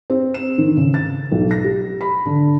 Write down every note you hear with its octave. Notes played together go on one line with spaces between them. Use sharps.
C4
E7
D#3
C#3
A6
B1
A#6
G4
B5
D3